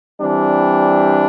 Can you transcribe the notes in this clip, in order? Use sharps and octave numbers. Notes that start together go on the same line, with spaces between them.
E3 G3 C4 D4